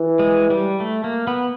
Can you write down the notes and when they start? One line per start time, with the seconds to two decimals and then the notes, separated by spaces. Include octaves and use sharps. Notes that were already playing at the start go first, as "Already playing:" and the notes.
Already playing: E3
0.19 G#3
0.50 G3
0.80 A3
1.04 A#3
1.27 B3